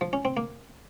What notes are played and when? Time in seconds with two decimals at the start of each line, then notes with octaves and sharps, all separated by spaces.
0.01 F3
0.13 C#4
0.25 C4
0.37 A#3